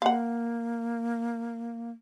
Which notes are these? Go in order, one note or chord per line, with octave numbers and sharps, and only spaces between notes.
A#3 F5 F#5